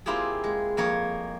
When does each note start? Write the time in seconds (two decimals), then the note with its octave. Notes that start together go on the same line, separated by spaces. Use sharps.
0.06 A#3 C4 E4 F4 G4 G#4
0.44 G#3
0.77 F2 A#3 C#5